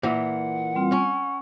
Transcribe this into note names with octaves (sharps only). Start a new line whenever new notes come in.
A#2 E3 F#5
G3 C4 F4
C#4 C#6